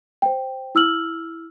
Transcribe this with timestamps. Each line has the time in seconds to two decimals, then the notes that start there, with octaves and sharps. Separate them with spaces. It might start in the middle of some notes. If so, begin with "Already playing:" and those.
0.22 C5 G5
0.75 E4 E6 F6 F#7